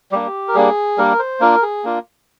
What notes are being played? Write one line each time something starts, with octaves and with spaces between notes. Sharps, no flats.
G3 A#3 D4 G4
A#4
G3 A#3 D4 G#4
G3 A#3 D4 A#4
C5
A#3 D4 F4 A#4
G#4
A#3 D4 F4